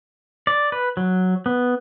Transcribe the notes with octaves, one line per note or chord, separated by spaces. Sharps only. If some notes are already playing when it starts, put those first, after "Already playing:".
D5
B4
F#3
B3